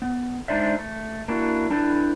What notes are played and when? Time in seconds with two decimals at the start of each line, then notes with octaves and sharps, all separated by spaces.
0.02 B3
0.48 G#3 D4 D#4 C5 D5 E5
0.79 A3
1.28 A#3 D4 E4 F#4
1.70 G3 D4 E4 G4 A4 B4